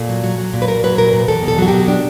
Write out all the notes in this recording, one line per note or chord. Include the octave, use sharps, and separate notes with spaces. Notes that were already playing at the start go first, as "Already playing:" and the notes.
Already playing: A#2 A4
F#3
F#3
F#3
A#2
B4
A#2 A#4
F#3 B4
A#2 A#4
A#2
E2 A4
B2
A4
F#3 F#4
B2 G4
D4